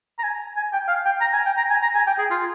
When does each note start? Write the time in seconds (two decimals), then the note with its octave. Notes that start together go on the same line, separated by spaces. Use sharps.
0.19 A#5
0.23 G#5
0.57 G#5
0.73 G5
0.88 F5
1.05 G5
1.21 A#5
1.33 G#5
1.46 G5
1.57 A#5
1.70 G#5
1.83 A#5
1.95 G#5
2.07 G5
2.19 G#4
2.31 F4